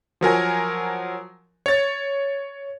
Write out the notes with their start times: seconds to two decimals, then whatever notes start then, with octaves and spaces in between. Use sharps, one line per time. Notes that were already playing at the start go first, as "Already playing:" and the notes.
0.21 F3 F#3 A#4 G#5
1.66 C#5 A6